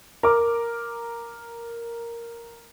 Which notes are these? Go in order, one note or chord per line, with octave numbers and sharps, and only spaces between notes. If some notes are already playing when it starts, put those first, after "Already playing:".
A#4 D6